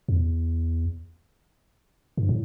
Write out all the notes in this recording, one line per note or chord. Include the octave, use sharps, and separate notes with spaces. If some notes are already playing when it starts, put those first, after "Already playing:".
E2
G2
A2